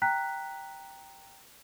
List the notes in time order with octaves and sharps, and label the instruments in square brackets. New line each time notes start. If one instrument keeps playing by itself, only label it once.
[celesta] G5 A#5 F#6 B6